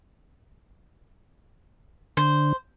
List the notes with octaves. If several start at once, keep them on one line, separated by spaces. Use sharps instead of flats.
D3 C5